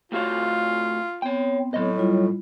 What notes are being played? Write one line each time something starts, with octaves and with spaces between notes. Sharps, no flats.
A2 F4 F#4 F5
B3 C4 C#5 G5
A2 F#3 D#5
G3 E4 F4